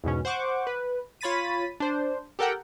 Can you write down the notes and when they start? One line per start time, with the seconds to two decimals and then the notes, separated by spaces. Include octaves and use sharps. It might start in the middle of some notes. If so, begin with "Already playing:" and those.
0.04 E2 G#2 B2 C#4
0.25 C5 F#5 C#6 D6
0.67 B4
1.21 F4 C#5 B5 A6 B6 D#7
1.80 D4 C5
2.39 G4 A4 A#4 F#5 G5